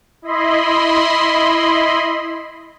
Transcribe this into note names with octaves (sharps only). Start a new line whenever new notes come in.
E4 D#5 B5 C6